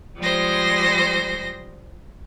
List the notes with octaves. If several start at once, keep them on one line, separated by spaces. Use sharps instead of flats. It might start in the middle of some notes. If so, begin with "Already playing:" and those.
F3 G3 G#3 C5 A#6